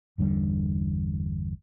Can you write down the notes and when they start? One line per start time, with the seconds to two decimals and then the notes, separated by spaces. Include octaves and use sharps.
0.18 G1 E2 D3 G3